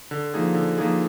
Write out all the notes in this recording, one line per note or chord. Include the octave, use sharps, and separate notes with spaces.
D3
F3 A#3 D#4 G#4
D3
F3 A#3 D#4 G#4